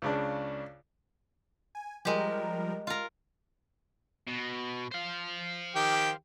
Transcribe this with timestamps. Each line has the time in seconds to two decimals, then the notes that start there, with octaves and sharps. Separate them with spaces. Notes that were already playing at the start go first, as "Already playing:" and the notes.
0.02 C#2 C#3 D4
1.75 G#5
2.05 F3 G3 G#3 G4 A#4
2.87 F4 A#4
4.27 B2
4.92 C5 F5
5.75 D#3 G4 G5